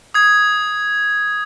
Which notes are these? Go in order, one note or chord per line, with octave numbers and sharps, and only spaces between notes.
D#6 G#6